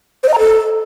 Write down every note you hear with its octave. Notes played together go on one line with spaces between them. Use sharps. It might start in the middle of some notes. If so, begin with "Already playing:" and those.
C5
D#5
A#5
A4